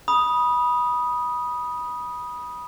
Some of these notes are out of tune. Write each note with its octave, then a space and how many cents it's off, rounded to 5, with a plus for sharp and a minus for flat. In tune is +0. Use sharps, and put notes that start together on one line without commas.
B5 -20 D#6 +0